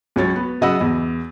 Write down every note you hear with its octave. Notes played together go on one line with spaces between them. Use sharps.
C#2 F#3 C#5 A6
B3
C#3 F#3 D#5 F#5 B5 E6
E2